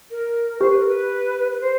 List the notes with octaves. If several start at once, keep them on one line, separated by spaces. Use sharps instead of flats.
A#4
G4 C5
B4
A#4
B4
B4
C5